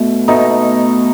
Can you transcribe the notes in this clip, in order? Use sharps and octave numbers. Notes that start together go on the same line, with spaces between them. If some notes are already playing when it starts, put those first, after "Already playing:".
Already playing: B2 A3
B2 A3 D#4